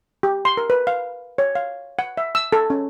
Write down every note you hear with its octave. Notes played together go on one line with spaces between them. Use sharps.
G4
C6
A#4
B4
F5
C#5
F5
F#5
E5
E6
A4
C#4